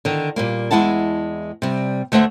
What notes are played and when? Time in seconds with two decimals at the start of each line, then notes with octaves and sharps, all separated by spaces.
0.05 D3 D#3
0.36 A#2 G3 A#3
0.71 E2 G#3 E4 F#5 A5
1.62 C3 G3
2.12 D2 A3 C5 E5 F#5